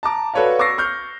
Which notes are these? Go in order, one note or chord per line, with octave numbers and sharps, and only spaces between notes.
A5 A#5 D6
F#4 A4 B4 C#5 D5 F5
C#6 D6 E6 A6 A#6 C7
C#6 F6 G6